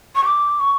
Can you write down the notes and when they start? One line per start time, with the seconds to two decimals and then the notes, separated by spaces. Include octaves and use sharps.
0.16 C#6
0.25 D6
0.60 C#6